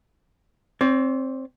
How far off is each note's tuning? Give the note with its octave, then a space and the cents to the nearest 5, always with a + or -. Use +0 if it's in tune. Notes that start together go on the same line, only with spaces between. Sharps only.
C4 +15 D5 -45